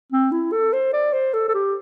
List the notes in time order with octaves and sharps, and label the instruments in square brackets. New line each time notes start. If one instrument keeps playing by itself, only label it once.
[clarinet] C4
E4
A4
C5
D5
C5
A4
A4
G4